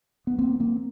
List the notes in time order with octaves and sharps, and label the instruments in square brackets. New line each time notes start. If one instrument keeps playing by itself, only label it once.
[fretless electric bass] B3
A#3 C4
A#3 C4